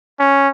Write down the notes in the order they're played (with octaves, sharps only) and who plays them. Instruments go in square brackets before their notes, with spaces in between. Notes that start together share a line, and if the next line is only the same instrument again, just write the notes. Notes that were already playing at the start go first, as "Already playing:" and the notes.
[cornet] C#4